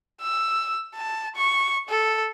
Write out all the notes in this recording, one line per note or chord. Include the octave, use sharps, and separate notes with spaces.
E6
A5
C#6
A4